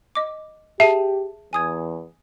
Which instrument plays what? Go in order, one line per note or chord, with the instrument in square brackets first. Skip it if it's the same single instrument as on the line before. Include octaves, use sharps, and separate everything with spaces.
[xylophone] D#5 D6
[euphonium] G4 [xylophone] G#4 A5 D#7 [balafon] E5
[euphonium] E2 [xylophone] G#5 D#6 G#6